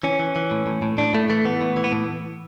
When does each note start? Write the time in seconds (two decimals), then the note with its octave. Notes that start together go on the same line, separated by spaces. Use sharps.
0.03 E3 C#4
0.19 E3
0.36 E3
0.51 A2
0.67 A2
0.82 A2
0.98 A2 D4
1.14 A2 A3
1.30 E3 A3
1.45 E3 B3
1.61 A2
1.77 E3
1.84 B3
1.92 A2